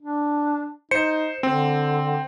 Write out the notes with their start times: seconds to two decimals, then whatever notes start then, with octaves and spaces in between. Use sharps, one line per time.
0.02 D4
0.91 D#4 C5 C#7
1.43 D3 C4